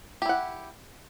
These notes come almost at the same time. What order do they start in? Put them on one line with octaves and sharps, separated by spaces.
G4 E4 F#5